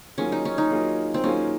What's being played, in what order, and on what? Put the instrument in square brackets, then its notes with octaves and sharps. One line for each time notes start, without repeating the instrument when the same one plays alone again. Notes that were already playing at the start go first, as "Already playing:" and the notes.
[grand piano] D#3 F#3 A#3 F4 G#4 [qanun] C#4
[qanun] D#4
C#4
D#4
[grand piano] D#3 F#3 A#3 F4 G#4
[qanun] C4
[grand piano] D#3 F#3 A#3 F4 G#4 [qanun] C#4